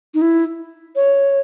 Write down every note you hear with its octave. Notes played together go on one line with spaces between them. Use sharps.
D#4
E4
C#5